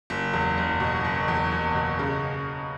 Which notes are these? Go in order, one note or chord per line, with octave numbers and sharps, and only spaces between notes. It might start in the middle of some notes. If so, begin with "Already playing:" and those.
F#1
E2
F#1
B2
F#1
E2
F#1
B2
C#3